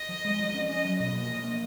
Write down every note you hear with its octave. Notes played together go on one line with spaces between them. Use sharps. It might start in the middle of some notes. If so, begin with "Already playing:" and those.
Already playing: D#5
F3
G#3
F3
C#4
C#4 D#5
F#3
B2 D#5
A#3
F3
A#3